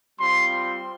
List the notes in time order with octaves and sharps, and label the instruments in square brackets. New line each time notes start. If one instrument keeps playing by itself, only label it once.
[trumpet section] G3 C4 F4 C6